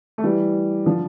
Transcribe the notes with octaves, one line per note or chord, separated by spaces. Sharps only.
A3
E3 G3
D3 F3